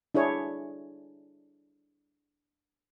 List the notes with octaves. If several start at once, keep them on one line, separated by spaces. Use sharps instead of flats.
D4 E4 G#4 C#5